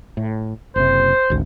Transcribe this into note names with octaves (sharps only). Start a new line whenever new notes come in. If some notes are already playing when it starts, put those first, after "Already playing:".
A2
F#1 C3 C5
G#1 D2